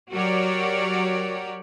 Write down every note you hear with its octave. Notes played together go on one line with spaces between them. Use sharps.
F#3 F#4 G4 A#4 C#5 D5